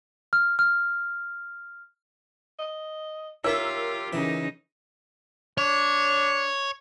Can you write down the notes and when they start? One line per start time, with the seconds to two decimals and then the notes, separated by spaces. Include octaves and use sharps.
0.33 F6
0.59 F6
2.59 D#5
3.44 F4 G4 A#4 C#5 E5 C#6 E6
4.13 C#3 E3 D#4
5.58 D4 C#5